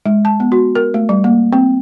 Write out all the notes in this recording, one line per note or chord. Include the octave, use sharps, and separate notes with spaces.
G#3
A5
B3
F#4
A#4
A3
G3
A#3
C4